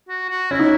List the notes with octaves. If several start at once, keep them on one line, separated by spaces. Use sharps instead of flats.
F#4
F#4
C#4 E4
D#4